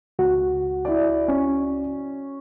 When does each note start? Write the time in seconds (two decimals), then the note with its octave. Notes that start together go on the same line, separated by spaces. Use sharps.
0.19 C#2 F#4
0.85 E4 D5
1.28 C#4